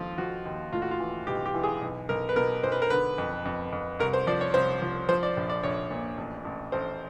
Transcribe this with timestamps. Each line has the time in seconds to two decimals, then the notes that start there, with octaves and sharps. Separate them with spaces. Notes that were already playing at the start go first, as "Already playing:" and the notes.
Already playing: D#2 F3 F4
0.18 F3 F#4
0.45 D#2
0.72 A2 F4
0.82 F#4
0.91 F4
1.00 E3
1.27 B1 G4
1.46 G4
1.54 E3
1.63 G#4
1.82 B1
2.09 B1 A#4
2.29 B4
2.36 B2 A#4
2.63 B1 C5
2.72 B4
2.82 A#4
2.90 D3 B4
3.18 F2
3.45 F2
3.72 F2
3.99 C2 A#4
4.13 C5
4.27 F3 D5
4.41 C#5
4.54 C2 C5
4.82 F3
5.09 F3 C5
5.23 D5
5.37 A#1
5.50 D5
5.63 A#1 C#5
5.91 A#2
6.18 A1
6.45 A1
6.72 A1 C5